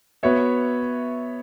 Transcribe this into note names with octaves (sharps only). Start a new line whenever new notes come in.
B3 F#4 C#5 E5